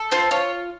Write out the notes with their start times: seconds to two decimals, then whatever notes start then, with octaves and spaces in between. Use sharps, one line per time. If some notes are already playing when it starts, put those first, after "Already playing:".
Already playing: A4
0.11 F4 C5 C6
0.31 F4 C#5